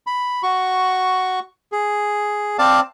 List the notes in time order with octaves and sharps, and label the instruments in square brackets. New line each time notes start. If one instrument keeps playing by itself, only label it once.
[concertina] B5
F#4 C#6
G#4
C4 D5 F5 A5